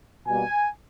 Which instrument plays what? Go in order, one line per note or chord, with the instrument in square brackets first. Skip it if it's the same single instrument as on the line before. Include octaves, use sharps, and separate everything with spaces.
[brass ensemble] B2 G3 A#3 G#5